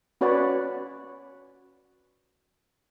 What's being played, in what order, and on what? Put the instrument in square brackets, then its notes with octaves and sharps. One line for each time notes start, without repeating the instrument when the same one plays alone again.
[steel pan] C#4 F#4 B4 C#5 D5 F#5